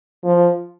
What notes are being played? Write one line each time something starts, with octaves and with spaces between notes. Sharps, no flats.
F3